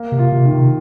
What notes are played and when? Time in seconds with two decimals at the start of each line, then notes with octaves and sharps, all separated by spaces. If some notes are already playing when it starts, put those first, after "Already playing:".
Already playing: A#3
0.12 C3
0.19 F4
0.32 C3
0.45 D#3
0.52 C3